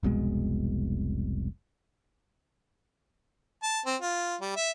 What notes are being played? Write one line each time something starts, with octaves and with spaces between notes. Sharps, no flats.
F1 C2 B2 G#3
A5
C4
F4
G3
E5